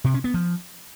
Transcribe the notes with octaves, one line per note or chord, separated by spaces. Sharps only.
C3
C#4
B3
F3